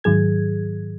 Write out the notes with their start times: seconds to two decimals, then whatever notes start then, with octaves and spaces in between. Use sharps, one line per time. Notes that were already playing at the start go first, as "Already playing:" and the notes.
0.04 G#2 D#3 F#3 G#4 G#6